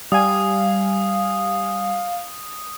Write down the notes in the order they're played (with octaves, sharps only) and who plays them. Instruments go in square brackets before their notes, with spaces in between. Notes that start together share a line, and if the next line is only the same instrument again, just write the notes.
[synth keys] G3 G#5 [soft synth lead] F5 [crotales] D#6